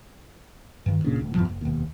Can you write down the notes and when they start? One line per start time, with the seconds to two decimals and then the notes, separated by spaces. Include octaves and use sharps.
0.86 G2 D#3
1.04 F#1 A#2 C#3 D4
1.19 D#1 D2
1.34 E2 G2 B2 F3
1.49 F#1
1.61 E1 D#2